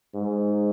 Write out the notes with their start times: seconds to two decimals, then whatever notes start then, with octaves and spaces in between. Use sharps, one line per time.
0.15 G#2